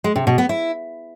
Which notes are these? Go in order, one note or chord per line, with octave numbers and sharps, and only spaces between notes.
G#3
C3
B2
B3
E4